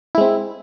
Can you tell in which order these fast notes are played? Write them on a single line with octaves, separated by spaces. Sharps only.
E4 G#3 C4